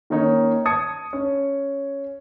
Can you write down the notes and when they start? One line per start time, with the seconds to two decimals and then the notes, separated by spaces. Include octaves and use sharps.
0.10 D#3 A#3 C#4 D#4 C#5
0.65 A5 D#6 G#6 C#7
1.13 C#4